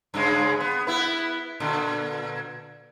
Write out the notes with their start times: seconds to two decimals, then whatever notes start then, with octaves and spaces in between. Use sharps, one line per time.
0.14 G2 C#3 G#3
0.60 B3
0.87 B3 E4 B4
1.60 A#2 D3